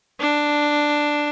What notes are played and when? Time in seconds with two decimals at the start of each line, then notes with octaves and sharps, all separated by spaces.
0.20 D4